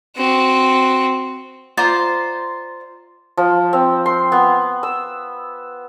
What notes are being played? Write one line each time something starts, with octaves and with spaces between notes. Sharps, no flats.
C4 F#4
F4 C5 D5 A#5
F3
C4
C6
B3
E6